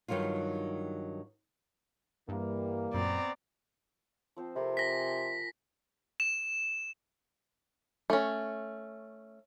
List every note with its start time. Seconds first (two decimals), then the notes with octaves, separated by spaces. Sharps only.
0.08 G2 D#3 F#3 D#4 F4
2.28 G2 E3 G3 A#3
2.94 F#2 A#2 B3 C4 D5 A#5
4.36 F3 C4 C5
4.56 C3 A4 A#4 B5
4.77 G#5 A#6 B6
6.20 E7
8.10 A3 C#4